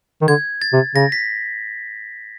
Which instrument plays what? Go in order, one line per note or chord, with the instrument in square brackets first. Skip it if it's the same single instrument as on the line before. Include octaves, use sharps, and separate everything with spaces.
[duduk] D#3
[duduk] D3 [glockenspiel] G#6
[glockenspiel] A6
[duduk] C3
[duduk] C#3 [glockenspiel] A#6
[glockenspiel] B6